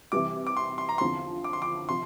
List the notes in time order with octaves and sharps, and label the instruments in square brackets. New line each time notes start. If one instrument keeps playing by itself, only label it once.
[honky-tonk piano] C3 E3 G3 [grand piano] D6
[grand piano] D6
C6
C6
A#5
[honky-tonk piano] E2 D3 F3 C4 [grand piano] C6
[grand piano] D6
C6
D6
[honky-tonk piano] C3 F3 [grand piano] C6